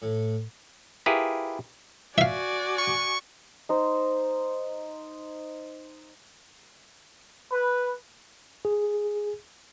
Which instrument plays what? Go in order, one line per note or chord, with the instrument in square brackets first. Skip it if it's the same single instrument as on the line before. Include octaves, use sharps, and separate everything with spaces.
[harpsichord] A2
[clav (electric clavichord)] E4 F4 G4 G#4 A#4 B4
[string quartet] F#4 D5 G#5 [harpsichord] E5 F5
[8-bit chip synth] C#6
[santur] D#4 C5
[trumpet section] B4
[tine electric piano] G#4